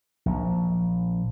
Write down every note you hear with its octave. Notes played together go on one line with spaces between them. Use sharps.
A#1